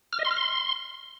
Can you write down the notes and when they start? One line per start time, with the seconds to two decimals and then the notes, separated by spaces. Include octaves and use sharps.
0.13 F6
0.19 D#5
0.25 C6
0.31 F6
0.37 C6